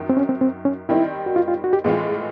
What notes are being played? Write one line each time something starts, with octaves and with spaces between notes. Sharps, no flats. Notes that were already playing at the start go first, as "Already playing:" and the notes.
Already playing: F#2 D#3 F#3
C4
C#4
C4
C4
C#4
D#3 G3 C4 D#4 E4
F#4
F4
F4
F#4
G4
A2 E3 G#3 C4 F4 G#4